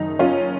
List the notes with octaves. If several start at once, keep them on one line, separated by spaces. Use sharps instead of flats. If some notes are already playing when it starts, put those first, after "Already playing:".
Already playing: F#1 F#2 D#3 D#4
F#1 C#4 F4